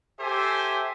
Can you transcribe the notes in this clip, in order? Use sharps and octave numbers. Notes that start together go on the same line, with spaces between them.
G4 A4 C5 E5 G#5